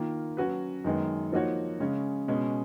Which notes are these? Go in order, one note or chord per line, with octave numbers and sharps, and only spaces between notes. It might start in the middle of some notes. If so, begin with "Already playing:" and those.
Already playing: D#3 A#3 F4
F#3 C#4 F#4 B4
F#2 D#3 G#3 B3
F3 A#3 D#4 F#4 C#5
C#3 G#3 C#4
B2 G#3 C#4